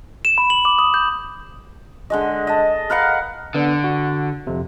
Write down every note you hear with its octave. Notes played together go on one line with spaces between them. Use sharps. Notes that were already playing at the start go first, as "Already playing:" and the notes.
E7
B5
F#7
D6
D#6
G6
D3 G#3 D#5
D#5 A5
A#4 B4 F5 F#5
D3 B3 D4
F#4
F2 C3